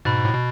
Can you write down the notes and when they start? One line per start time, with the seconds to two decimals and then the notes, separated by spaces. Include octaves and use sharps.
0.05 G#2 B2 B5 F#6 A6
0.25 A2
0.34 B2